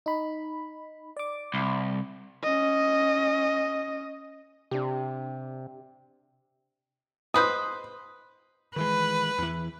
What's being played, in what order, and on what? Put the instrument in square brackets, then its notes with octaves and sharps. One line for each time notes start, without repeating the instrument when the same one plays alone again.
[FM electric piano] D#4 B5
D5 D6
[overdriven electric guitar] C2
[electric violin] C#4 D#5
[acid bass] C3 [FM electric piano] D4 G4
[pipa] G#3 B4 C5 [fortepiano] D#6
[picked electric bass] D#3 E3 G#3 [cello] B4
[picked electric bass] E2 E3